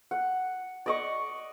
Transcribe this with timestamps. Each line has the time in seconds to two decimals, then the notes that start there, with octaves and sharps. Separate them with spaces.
0.11 F#5
0.86 D5 D#5 C#6